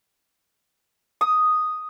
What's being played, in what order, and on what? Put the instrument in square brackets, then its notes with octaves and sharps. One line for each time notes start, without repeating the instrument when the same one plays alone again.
[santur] D#6